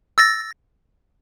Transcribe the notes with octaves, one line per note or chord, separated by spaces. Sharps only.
E6 A6 A#6